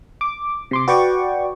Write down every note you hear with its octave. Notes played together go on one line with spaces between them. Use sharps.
D6
C3 C6 D6
F#4 B4 D5 G5 C#6 D6